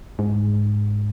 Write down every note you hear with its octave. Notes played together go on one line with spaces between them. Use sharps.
G#2